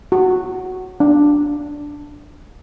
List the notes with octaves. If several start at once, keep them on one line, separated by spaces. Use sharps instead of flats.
F#4
D4